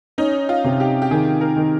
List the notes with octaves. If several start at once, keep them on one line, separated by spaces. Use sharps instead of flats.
C#4 D#4
F4
C3
G4
G4
D#3 G#4
A#4
D#3